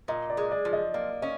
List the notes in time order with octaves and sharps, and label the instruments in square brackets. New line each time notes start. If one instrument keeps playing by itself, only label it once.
[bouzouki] A#2 [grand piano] D#5
[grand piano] D5
[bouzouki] G#3
[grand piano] D5
[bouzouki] F3
[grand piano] D#5
[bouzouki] A#3 [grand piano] D5
[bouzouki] C#4 [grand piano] D#5